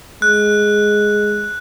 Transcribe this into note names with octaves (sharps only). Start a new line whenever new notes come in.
G#3 F#6